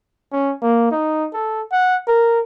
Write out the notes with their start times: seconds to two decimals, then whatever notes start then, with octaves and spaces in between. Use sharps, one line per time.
0.32 C#4
0.62 A#3
0.91 D#4
1.33 A4
1.72 F#5
2.07 A#4